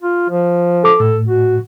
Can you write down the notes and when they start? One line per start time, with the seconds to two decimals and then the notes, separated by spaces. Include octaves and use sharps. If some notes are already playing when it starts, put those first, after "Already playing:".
0.02 F4
0.30 F3
0.84 A4 D6
1.00 A2 A4
1.28 F#4